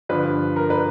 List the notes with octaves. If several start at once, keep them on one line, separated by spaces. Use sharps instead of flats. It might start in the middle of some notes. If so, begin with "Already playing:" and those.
G2 D3 F3 B4
A#4
B4